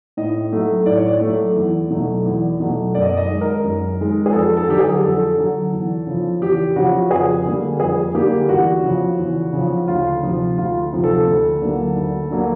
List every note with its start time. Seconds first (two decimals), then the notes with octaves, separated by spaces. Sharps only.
0.17 A2 D#5
0.52 F#3 A3
0.86 A2 D5
0.96 C#5
1.08 D5
1.21 F#3 A3
1.56 E2
1.90 B2 F#3 A3
2.26 E2
2.60 B2 F#3 A3
2.95 F#2 D5
3.02 D#5
3.10 D5
3.17 D#5
3.29 D#3 G#3
3.41 A#4
3.64 F#2
3.98 D#3 G#3
4.26 G#4
4.33 F2 A4
4.57 A4
4.68 D3 F#3 G4
4.79 G#4
5.02 F2 A4
5.37 D3 F#3
5.73 E2
6.07 C#3 F3
6.41 E2 G4
6.76 C#3 F3 F#4
7.11 F2 G#4
7.45 D3 G3 A#3
7.80 F2 G#4
8.14 D3 G3 A#3 G4
8.49 E2 F#4
8.83 C#3 F3
9.18 E2
9.53 C#3 F3
9.88 D2 F4
10.23 C3 F3
10.57 D2 F4
10.92 C3 F3
11.04 A4
11.27 D2
11.62 D3 F#3 A#3
11.96 D2
12.30 D3 F#3 A#3